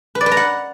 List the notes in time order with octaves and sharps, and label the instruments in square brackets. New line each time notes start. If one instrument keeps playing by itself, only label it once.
[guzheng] B4
D5
B4
A#5
F#5